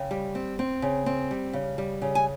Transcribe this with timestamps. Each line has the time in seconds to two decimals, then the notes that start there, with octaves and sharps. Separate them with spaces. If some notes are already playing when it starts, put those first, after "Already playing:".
Already playing: C#3 G5
0.11 G3
0.35 C4
0.59 C4
0.82 C#3
1.06 C4
1.31 G3
1.53 C#3
1.78 G3
2.02 C#3
2.15 G#5